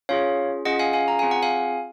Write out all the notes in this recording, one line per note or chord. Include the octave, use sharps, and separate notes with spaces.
C#4 F4 G#4 C#5 F5
C#4 F4 G#4 D#5 F#5
F5 G#5
F5 G#5
A#5
C4 F4 G#4 G#5
F#5
F5 G#5